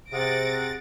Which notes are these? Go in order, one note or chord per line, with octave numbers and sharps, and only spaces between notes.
C3 G#4 F#5 A6 A#6 D7